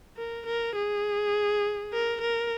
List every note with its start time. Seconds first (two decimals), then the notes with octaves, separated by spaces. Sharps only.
0.17 A#4
0.46 A#4
0.75 G#4
1.93 A#4
2.21 A#4